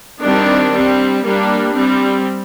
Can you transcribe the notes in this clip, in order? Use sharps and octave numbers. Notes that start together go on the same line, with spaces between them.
D#3 G3 C4 D4
G3 C4
G3 A#3 D4
G3 C4